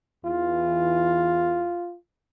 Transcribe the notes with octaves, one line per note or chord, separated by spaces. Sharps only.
E2 E3 F4